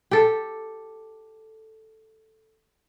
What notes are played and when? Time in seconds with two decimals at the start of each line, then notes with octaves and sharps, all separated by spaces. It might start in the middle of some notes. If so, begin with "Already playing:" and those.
0.11 G4 A4